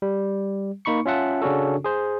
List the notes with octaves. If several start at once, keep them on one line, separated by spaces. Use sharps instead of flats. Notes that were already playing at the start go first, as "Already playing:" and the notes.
G3
A#3 D#4 B5 C#6 C#7
C#4 F4 E5 F#5 A5
C#3 C#4 D4 F#4 A4
G#4 C5